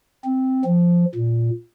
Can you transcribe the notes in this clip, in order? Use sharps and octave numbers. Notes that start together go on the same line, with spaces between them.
C4
F3
A#2